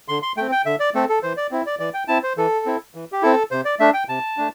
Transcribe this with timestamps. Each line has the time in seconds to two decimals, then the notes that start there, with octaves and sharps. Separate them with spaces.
0.08 D3 C6
0.22 C6
0.37 A3 C4 G5
0.52 G5
0.66 D3 E5
0.80 D5
0.94 A3 C4 A4
1.09 A4
1.23 E3 C5
1.37 D5
1.51 C4 E4
1.66 D5
1.79 E3 D5
1.94 G5
2.08 C4 E4 A5
2.23 C5
2.37 E3 A4
2.66 C4 E4
2.95 E3
3.12 G4
3.22 C4 E4 A4
3.51 C3 C5
3.65 D5
3.79 A3 D4 E5
3.94 G5
4.09 C3 A5
4.37 A3 D4